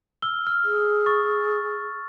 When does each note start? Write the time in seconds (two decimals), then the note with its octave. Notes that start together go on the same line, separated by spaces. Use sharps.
0.22 E6 F6 G7
0.47 F6
0.64 G#4
1.06 C#6 A6